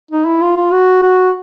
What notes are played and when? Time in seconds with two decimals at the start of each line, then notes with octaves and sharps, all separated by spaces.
0.11 D#4
0.27 E4
0.41 F4
0.56 F4
0.72 F#4
1.02 F#4